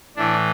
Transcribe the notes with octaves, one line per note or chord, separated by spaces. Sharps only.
A2 E3 D4